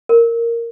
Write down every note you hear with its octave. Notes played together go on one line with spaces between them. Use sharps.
A#4